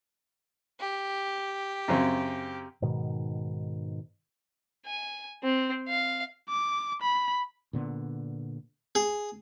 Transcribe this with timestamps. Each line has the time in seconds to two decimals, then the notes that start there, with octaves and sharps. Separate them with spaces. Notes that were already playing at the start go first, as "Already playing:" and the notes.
0.80 G4
1.88 F#2 C#3 C4
2.82 G#2 B2 D#3
4.86 G#5
5.43 C4
5.89 F5
6.49 D6
7.02 B5
7.73 A#2 D3 B3
8.95 G#4